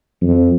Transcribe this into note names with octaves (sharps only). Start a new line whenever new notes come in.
F2